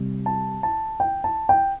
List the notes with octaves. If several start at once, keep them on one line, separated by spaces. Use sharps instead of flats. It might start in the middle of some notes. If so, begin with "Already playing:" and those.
Already playing: C3 G3
A5
A5
G5
A5
G5